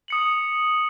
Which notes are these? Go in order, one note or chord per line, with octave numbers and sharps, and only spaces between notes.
D#6 C#7 F#7